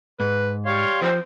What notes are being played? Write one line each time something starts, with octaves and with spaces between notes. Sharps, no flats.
G#2 B4
G3 C#5 F5 C6
F3 C5